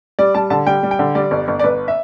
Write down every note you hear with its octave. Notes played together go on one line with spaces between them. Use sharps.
G3 D5
G3 A5
D3 A5
G3 G5
G3
G5
D3
G3 D5
G1
G1
D5
G1 B4
E5